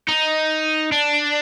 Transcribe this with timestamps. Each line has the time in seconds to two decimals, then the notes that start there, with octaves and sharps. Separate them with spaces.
0.08 D#4
0.92 D4